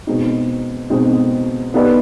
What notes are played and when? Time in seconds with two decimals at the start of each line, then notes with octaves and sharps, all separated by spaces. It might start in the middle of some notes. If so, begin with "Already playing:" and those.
0.07 B2 G#3 C4 D#4
0.90 B2 G#3 C4 D#4
1.74 B3 D#4 G4 B4 D5